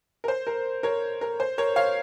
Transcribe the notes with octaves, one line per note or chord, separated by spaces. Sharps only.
A#4
C5
A#4
A#4 C#5
A#4
C5
A#4 C#5
C#5 F5